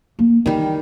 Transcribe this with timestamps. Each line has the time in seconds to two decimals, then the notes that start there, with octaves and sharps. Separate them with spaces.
0.19 A#3
0.46 D#3 E3 G3